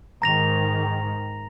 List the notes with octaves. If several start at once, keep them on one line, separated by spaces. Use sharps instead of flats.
G#2 D#3 A#5 A#6 F7